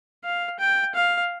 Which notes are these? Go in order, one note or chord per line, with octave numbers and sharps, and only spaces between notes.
F5
G5
F5